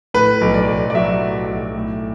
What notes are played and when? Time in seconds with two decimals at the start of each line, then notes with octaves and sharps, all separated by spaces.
0.14 A2 B4
0.41 B1
0.54 D5
0.68 B1
0.90 D5
0.95 F#3 E5
1.22 A2
1.49 B1
1.76 A2